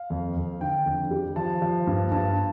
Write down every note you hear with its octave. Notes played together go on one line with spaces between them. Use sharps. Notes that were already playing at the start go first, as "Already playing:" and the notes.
Already playing: F5
F2
F2
D3 G5
F2
G3
F3 A5
F3
G2
G2 A5